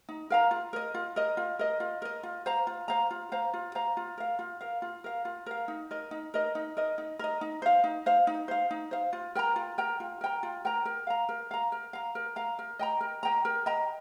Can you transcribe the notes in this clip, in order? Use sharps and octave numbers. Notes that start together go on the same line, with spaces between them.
D#4
A#4 F5 A#5
F4
A#4 D#5
F4
A#4 D#5
F4
A#4 D#5
F4
A#4 D#5
F4
C5 F5 A#5
F4
C5 F5 A#5
F4
C5 F5 A#5
F4
C5 F5 A#5
F4
A#4 F5
F4
A#4 F5
F4
A#4 F5
F4
A#4 F5
D#4
A#4 D#5
D#4
A#4 D#5
D#4
A#4 D#5
D#4
A#4 D#5
D#4
C5 F5
D#4
C5 F5
D#4
C5 F5
D#4
C5 F5
F4
A#4 G5 A#5
F4
A#4 G5 A#5
F4
A#4 G5 A#5
F4
A#4 G5 A#5
A#4
F5 A#5
A#4
F5 A#5
A#4
F5 A#5
A#4
F5 A#5
A#4
D#5 G5 A#5
A#4
D#5 G5 A#5
A#4
D#5 G5 A#5